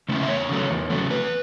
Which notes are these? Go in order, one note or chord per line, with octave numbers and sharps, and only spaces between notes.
C#3 A3 C#4 E4
E5
E2 C#5
C#3 F#3 A3
E2
C#3 F#3 A3
E2 B4